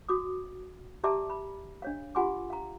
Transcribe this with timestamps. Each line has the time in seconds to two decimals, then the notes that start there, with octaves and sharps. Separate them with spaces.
0.09 F#4 D6 D#6
1.04 G4 D5 E5 A5 A#5 D6
1.30 B5
1.82 D4 C#5 F5
2.15 F4 G4 F#5 G#5 C6 D6
2.50 F5 A#5